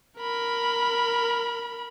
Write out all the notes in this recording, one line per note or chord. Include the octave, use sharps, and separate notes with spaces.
A#4 B5